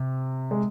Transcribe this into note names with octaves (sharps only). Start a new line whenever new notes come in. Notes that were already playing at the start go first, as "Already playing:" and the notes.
Already playing: C3
G#3